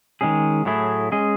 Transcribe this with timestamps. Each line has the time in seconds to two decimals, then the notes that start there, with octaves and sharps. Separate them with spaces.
0.21 D#3 G#3 C#4 G#4
0.65 A2 F#3 A3 E4 G#4
1.12 G#3 C#4 G#4 D#5